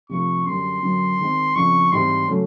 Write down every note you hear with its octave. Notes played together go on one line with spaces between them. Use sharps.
C3 F3 A3 D4 F4 C#6
F#2 D3 G3 C6
F#2 D3 F#3
D#3 G#3 C4
F2 C#3 F3 C#6
G#2 E3 G3 C4 C6
C#3 F#3 A3 C#4